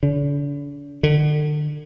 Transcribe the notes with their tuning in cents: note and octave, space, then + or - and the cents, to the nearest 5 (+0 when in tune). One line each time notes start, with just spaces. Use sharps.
D3 -40
D3 +35